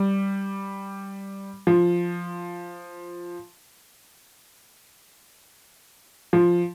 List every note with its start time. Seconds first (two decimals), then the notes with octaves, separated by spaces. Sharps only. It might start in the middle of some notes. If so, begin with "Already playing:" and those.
Already playing: G3
1.67 F3
6.33 F3